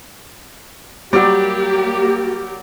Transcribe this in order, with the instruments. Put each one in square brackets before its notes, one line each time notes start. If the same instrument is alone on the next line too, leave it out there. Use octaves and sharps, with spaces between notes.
[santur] F#3 D5 [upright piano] G3 [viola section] A#3 G4